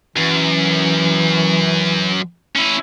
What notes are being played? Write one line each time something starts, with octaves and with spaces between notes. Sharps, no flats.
F#2 E3
C#4 E4